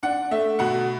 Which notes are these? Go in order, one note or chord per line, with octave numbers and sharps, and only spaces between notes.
D4 F#5
A3 E5
B2 F#5